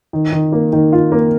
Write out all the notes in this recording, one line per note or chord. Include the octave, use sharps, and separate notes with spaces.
D#3
D#3
A#3
D#3
F4
A#3